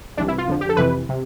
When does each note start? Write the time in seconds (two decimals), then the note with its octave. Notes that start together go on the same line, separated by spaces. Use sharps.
0.17 C2 C3 E3 D4
0.28 E4
0.38 F4
0.47 F2 D3 F3
0.61 G4
0.69 A4
0.77 F2 C3 E3 B4
1.09 C3